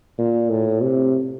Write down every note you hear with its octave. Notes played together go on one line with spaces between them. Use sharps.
A#2
A2
C3